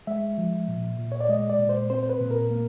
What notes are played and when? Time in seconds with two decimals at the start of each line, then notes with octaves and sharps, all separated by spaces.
0.07 G#3 E5
0.38 F3
0.68 A#2
0.99 A#2
1.12 C#5
1.21 D5
1.29 G#3 D#5
1.50 D5
1.59 A#2
1.69 C5
1.90 C4 C5
2.03 C5
2.09 B4
2.21 A#2
2.31 A#4
2.51 A#3